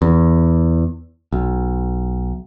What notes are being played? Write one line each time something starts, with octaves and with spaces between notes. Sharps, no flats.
E2
B1